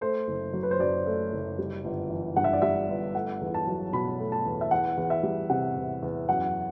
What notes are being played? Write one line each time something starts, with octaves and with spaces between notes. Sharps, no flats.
A3 C5
F#1
F#3
B4
C5
F#2 D5
A3
F#1
G3
G1
E3
G2 F#5
E5
D5
G3 E5
G1
A3 F#5
E2
A5
F#3
B2 B5
A3
A5
E2
E5
E2 F#5
E2
E5
G3
C3 F#5
E2
E2
F#2 F#5